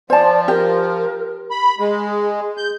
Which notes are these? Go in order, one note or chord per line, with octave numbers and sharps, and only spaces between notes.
F3 C5 D5 A5
G4 A#4
B5
G#3 G#4
G6